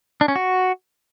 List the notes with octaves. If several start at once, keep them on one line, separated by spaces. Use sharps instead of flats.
D4
C#4
F#4